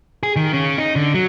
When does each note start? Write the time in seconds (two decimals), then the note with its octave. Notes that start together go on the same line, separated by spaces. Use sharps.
0.23 G#4
0.36 D#3
0.53 C#3
0.78 D#4
0.96 D3
1.14 F#3